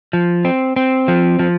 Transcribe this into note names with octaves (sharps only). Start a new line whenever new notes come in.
F3
C4
C4
F3
F3